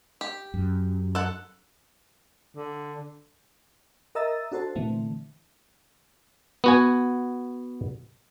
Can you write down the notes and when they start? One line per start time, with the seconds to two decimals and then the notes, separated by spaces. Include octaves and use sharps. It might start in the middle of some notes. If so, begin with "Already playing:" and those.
0.21 G4
0.54 F#2
1.15 A4 F#5
2.56 D3
4.15 A#4 D#5 E5 A#5 E6 A6
4.52 D4 F#4 A4 C5 A5
4.75 A#2 D3 E3 A3 C4
6.64 B3 F#4 G#5